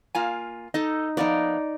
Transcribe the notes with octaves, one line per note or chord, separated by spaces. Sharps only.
A#3 F4 G#5
D#4 A4 D#5
F3 A#3 B3 D#4 D5